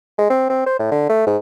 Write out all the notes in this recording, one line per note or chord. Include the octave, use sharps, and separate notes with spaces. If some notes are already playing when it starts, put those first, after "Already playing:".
G#3
C4
C4
C5
A2
D3
A3
G#2